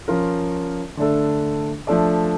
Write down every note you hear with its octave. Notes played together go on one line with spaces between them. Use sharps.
F3 C#4 F4 A#4
D3 A3 D4 A4
F3 A3 D4 A4 D5